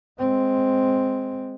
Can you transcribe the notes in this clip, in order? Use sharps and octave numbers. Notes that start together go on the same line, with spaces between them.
G#3 C4